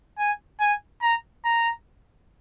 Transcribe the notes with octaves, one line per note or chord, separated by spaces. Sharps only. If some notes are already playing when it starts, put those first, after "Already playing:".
G#5
G#5
A#5
A#5